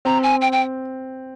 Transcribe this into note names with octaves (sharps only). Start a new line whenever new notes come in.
C4 A#5
G#5
G5
G5